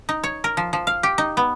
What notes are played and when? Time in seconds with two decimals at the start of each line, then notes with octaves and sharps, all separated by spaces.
0.09 D#4
0.24 C#5
0.44 A#4
0.57 F3
0.73 F3
0.87 F5
1.03 G4
1.18 D#4
1.37 B3